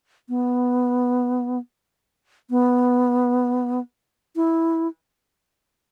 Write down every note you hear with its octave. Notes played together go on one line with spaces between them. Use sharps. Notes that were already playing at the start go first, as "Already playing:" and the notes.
B3
B3
E4